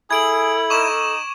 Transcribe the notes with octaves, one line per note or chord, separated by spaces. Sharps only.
E4 G#4 A4 G#6 D7 F#7
D#4 C#6 D6 E7